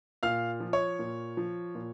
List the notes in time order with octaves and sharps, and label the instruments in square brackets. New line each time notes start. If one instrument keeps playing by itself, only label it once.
[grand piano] A#2 F5 F6
F3
C#5 C#6
A#2
F3
A#2